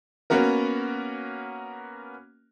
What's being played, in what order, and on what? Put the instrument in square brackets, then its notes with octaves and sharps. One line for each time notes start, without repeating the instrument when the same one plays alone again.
[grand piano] A#3 B3 C#4 F#4 A#4